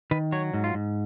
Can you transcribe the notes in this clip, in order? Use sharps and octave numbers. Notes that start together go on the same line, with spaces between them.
D#3 B4
F#3 C#5
G#2
F4
G#2